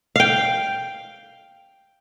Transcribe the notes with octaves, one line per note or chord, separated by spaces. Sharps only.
F5 G5